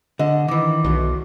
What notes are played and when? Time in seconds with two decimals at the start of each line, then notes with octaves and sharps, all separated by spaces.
0.19 D3 D#5
0.48 D#3 E3 D6
0.84 B1 E2 B2 F#4